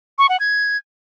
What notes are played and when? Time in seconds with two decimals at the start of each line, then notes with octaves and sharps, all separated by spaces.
0.18 C#6
0.29 F#5
0.40 G#6